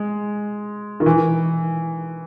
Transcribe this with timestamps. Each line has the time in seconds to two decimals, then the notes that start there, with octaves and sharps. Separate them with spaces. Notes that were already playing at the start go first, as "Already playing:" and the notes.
Already playing: G#3
1.00 D#3
1.06 E3